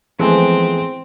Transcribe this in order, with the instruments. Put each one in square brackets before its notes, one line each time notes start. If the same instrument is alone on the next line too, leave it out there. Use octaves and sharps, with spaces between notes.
[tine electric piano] E3 B3 [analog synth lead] F3 [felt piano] G#3 A3 G#5 [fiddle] C4